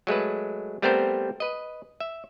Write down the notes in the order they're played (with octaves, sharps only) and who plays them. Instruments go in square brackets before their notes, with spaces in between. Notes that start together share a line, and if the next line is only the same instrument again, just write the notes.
[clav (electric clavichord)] F#3 G#3 A3 B4
G3 A3 B3 C4 A#4 C5
B4 D#5
E5